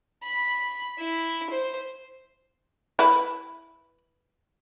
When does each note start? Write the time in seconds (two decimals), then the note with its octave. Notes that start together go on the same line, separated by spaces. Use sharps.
0.23 B5
0.99 E4
1.50 C5
2.99 E4 B4